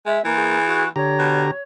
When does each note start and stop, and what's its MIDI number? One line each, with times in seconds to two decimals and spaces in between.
0.06 0.19 56
0.06 0.21 76
0.25 0.87 52
0.25 0.58 58
0.38 0.85 68
0.65 0.88 66
0.96 1.51 50
0.96 1.51 67
0.96 1.62 73
0.96 1.51 82
1.19 1.46 47